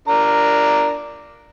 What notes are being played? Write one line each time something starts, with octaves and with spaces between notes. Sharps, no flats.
D4 A#4 A#5